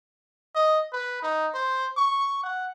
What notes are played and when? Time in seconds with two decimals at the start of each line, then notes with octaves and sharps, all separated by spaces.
0.55 D#5
0.93 B4
1.22 D#4
1.54 C5
1.97 C#6
2.43 F#5